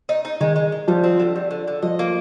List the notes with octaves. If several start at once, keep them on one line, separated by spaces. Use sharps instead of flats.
D#4
D#4
D#3 G#3
G#3
G#3
F3 G3
C4
D3
G3
D3
D3
F3 D#5
A#3